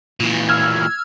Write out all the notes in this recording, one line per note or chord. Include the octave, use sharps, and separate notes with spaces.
A#2 E3
E6 F6 G#6